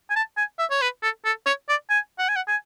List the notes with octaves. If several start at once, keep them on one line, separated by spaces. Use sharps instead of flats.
G#5
A5
G#5
E5
C#5
B4
A4
A4
C#5
D5
G#5
F#5
G#5
F#5
G#5